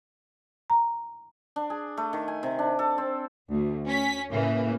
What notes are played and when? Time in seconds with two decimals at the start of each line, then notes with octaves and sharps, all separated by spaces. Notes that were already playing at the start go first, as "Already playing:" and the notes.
0.70 A#5
1.56 D4
1.70 G#4
1.97 A3
2.13 D#3
2.28 G#5
2.43 C3
2.59 D4
2.79 A4
2.98 C4
3.50 D2
3.88 C#4 B6
4.30 A2 C#3 E3 A#3